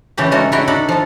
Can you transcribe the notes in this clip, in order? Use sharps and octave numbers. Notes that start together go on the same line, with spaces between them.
C#3 E3 A3 G4 B4
G#3 F#4 A4 A#4
C#3 E4 F#4 E5 G5
D4 D#4 F#4 A4 B5
F3 A4